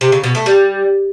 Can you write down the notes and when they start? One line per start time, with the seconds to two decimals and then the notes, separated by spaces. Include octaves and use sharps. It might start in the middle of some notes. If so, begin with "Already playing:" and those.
0.01 C3
0.12 C#3
0.24 B2
0.35 A3
0.46 G3